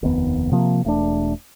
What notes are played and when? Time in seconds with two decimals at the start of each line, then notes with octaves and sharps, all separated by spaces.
0.02 F1 D#2 B3
0.51 C3 F3 A#3
0.84 E1 A3 D4